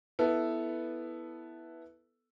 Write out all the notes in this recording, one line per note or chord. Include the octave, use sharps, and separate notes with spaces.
B3 E4 A4 B4